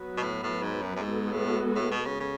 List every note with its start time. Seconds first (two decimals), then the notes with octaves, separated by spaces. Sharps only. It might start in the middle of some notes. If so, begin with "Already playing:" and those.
Already playing: F#3 B3 F#4 B4
0.17 B2
0.23 A2
0.43 A2
0.62 G#2
0.82 F#2
0.96 F#2
1.02 G#2 G#3 B3 F#4 A4
1.32 A2
1.76 A2
1.91 B2
2.06 C#3
2.20 C#3